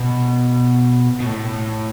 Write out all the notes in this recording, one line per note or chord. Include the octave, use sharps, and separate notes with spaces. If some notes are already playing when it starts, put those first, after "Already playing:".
Already playing: B2
B2
A2